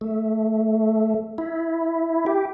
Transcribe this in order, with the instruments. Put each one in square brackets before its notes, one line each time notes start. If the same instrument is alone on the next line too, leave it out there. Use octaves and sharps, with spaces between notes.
[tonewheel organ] A3
E4
G4